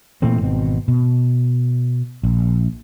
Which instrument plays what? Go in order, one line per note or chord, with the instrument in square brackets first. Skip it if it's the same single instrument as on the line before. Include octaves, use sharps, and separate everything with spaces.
[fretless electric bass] A#2 E3 A3 C4
G#1 B2 C4
B2
A#1